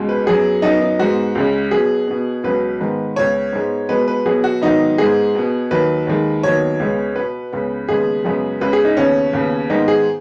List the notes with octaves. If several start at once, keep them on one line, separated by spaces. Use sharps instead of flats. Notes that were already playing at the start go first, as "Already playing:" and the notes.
Already playing: C#2 B2 G#3
B4
F#2 F#3 B3 G#4
F#2 F#3 B3 D#4
D#4
G#2 G#3 B3 F#4
C#2 C#3 G#3
B2 F#3 B3 G#4
B2 B3
C#2 B2 F#3 B3 B4
G#2 D#3 G#3 B3
C#2 C#3 B3 C#5
G#2 G#3 B3
B2 G#3 B3 B4
B4
B2 F#3 B3 G#4
F#4
G#2 D#3 F#3 B3 D#4
G#2 G#3 B3 G#4
B2 B3
D#2 D#3 F#3 B4
D#2 D#3 G#3
D#2 D#3 F#3 B3 C#5
C#2 C#3 G#3 B3
B2 B3 B4
C#2 C#3 B3
D#2 C#3 G#3 B3 G#4
F#2 C#3 G#3 B3
C#2 C#3 B3 B4
G#4
D#4
D#2 C#3 B3 C#4
D#2 C#3 B3
G#2 D#3 G#3 B3 D#4
G#4